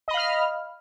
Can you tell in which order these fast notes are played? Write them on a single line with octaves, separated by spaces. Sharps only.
D#5 B5 F5 F6